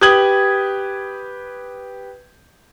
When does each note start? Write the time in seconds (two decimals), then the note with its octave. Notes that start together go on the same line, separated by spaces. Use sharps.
0.01 G4 B4 D#6 G#6 F#7